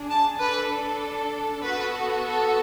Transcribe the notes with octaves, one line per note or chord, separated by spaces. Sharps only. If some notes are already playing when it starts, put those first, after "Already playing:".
Already playing: D4 G#4
A5
D4 A4 B4
B3 F#4 A4 B4
A4